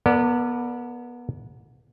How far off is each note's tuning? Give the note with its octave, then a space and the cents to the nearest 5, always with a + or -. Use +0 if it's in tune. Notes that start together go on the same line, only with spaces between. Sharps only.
B3 -25 A4 +45 D5 +0